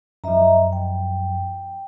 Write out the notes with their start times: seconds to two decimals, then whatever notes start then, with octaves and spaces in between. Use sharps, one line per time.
0.24 F#2 F3 D#5 E5 A#5
0.73 G5